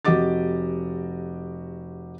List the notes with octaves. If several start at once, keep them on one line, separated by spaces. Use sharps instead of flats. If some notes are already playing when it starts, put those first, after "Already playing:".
F1 F#4 G4 D#5 D6 A6